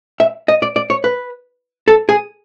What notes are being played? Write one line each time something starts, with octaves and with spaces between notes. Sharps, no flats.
E5
D#5
D5
D5
C#5
B4
A4
G#4